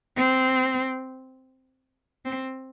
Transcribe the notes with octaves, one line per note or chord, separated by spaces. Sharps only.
C4
C4